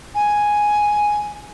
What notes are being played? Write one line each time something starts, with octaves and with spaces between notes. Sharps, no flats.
G#5